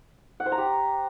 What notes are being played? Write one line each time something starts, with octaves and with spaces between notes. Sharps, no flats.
F#5
C5
A#5
G4